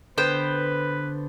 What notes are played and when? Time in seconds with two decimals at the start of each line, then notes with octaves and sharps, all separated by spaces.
0.18 D3 B3 B4 C5 G5